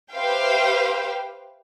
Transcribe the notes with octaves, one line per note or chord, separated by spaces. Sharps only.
G4 B4 C5 E5 F5 G5